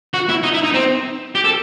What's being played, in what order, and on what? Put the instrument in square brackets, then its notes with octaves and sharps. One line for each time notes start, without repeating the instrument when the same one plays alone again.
[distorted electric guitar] F#4
E4
D#4
E4
D#4
C4
G4
A4